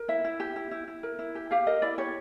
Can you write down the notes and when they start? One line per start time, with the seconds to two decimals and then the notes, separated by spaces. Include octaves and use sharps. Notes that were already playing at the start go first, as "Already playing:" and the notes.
Already playing: A#4
0.08 E4 E5
0.24 E4
0.40 G4
0.56 E4
0.71 E4
0.88 E4
1.03 A#4
1.19 E4
1.35 G4
1.51 G4 F5
1.67 A#4 D#5
1.82 E4 D5
1.98 G4 C#5